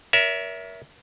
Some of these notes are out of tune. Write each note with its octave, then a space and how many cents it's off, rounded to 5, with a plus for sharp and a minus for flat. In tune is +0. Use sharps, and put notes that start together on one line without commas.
A#4 +25 C#5 +40 E5 +0